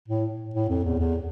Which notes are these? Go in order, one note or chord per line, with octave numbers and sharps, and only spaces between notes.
A2
A2
F2
E2
E2